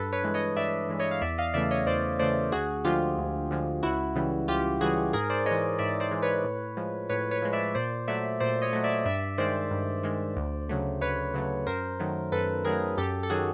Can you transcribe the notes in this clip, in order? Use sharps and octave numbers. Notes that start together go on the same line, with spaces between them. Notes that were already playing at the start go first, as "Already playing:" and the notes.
Already playing: G2 A4 B4
B4 C#5
E3 G#3
C#5 D#5
G2 D5 E5
E3 G#3
C#5 D#5
F5
E2 D5 E5
D#5 F5
C#3 E3 A3 D5 E5
C#5 D#5
E2 C5 D5
C#3 E3 A3 C5 D5
D2 F#4 G#4
D3 F3 G#3 F4 G4
D2
D3 F3 G#3
C#2 E4 F#4
C#3 E3 G3
C#2 F4 G4
C#3 E3 G3 F#4 G#4
G#2 G#4 A#4
C5 D5
G#3 C#5 D#5
E3
G#2 D5 E5
C5 D5
E3 G#3
B4 C#5
A2
F3 G#3
A2 B4 C#5
B4 C#5
F3 G#3
D5 E5
A#2 C5 D5
F#3 A3 D5 E5
A#2 C5 D5
C#5 D#5
F#3 A3
D5 E5
G2 D5 E5
D#3 G#3 C5 D5
G2
D#3 G#3
D2
C#3 F#3 A3
D2 B4 C#5
C#3 F#3 A3
F#2 A#4 C5
D#3 F#3 A3
F#2 A4 B4
D#3 F#3 A3 G#4 A#4
F#2 G4 A4
A4
D#3 F#3 F#4 G#4